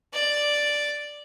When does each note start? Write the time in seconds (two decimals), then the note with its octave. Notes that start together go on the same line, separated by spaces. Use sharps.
0.13 D5